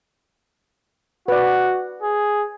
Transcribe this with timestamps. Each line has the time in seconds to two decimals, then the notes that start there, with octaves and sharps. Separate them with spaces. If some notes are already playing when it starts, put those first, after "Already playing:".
1.28 F#4 B4 D5
2.02 G#4